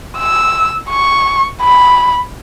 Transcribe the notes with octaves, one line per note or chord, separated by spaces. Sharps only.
E6
C#6
B5